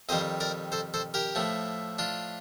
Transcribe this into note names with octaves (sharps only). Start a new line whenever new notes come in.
F2 D#3 G3 C5 D#5
A#4 D5
A4 C5
A4 C5
G4 A#4
A2 F3 A3
D4 F4